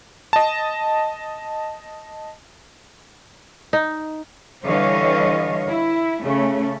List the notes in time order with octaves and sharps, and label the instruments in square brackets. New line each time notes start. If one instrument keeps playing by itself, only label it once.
[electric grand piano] D#5 A5
[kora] D#4
[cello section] D3 E3 G3 C#5 D#5 F5
E4
C#3 A3 C#4